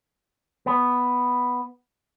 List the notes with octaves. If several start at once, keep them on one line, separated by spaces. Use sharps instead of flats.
B3